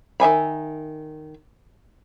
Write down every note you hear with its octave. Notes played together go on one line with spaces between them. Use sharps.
D#3 E5 G#5 B5